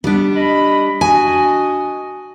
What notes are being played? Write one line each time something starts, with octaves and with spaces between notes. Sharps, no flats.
G3 B3 D4
D#5 B5
D4 F#4 D#5 G#5